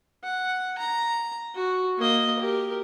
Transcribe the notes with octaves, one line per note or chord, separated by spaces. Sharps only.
F#5
A#5
F#4
A#3 D#5
G4 A#4